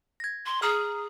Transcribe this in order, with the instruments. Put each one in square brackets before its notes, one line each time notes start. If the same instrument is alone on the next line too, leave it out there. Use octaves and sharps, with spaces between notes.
[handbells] G#6 A#6
[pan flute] C6
[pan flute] G#4 [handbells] A#5 D#6 F6